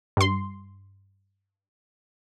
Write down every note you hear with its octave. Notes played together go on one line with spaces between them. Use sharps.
G2 C6